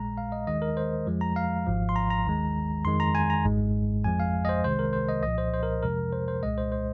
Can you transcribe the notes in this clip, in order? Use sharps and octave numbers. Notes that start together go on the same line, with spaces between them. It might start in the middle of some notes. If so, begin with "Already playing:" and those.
Already playing: A#1 A#2 G#3 A#5
F5
D#5
D#2 D#3 G#3 D#5
A#4
C5
F2 F3 G#3
A#5
F5
G#1 G#2 F3
C6
A#5
A#5
D#2 D#3 G#3
F2 D#3 G#3 C6
A#5
G#5
A#5
G#1 G#2 G#3
F2 F3 G#3 G#5
F5
D#5
C5
C2 C3 D#3 G#3 C5
A#4
C5
D#5
C2 A#2 F3 D#5
C5
C5
A#4
F2 C3 F3 G#3 A#4
C5
C5
C2 A#2 G#3 D#5
C5
C5